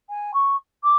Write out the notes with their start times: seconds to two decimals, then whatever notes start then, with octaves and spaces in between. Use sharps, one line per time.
0.09 G#5
0.34 C#6
0.83 D6